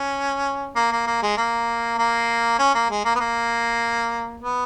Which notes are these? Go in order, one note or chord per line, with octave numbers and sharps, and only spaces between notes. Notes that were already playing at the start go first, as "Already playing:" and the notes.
Already playing: C#4
A#3
A#3
A#3
G#3
A#3
A#3
C#4
A#3
G#3
A#3
B3
A#3
B3